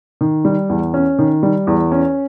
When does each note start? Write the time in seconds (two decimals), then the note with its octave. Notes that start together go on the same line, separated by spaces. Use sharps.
0.21 D#3
0.45 G3
0.69 E2
0.94 C#4
1.19 D#3
1.43 G3
1.67 E2
1.92 C#4